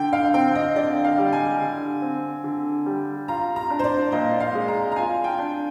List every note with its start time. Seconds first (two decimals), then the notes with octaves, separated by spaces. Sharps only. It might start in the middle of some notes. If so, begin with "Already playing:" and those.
Already playing: D3 G5
0.13 F5
0.34 C4 G5
0.55 D#5
0.76 D3 D5
1.05 F5
1.18 G3
1.33 G#5
1.60 D3
2.02 C4
2.44 D3
2.86 G3
3.28 F4 A#5
3.56 A#5
3.70 D4
3.79 C5
3.84 D5
4.12 A#2 D#5
4.40 F5
4.55 G#3
4.68 A#5
4.92 A#5
4.96 F4 G#5
5.24 G5
5.39 D4